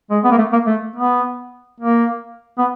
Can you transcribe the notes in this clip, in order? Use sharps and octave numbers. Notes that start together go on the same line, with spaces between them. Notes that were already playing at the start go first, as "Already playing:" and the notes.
G#3
B3
A#3
A3
A#3
A3
B3
A#3
B3